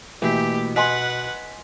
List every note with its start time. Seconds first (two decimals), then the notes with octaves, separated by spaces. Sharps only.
0.22 B2 E3 A3 A#3 G4 B6
0.76 B4 D#5 F#5 G#5 C6 B6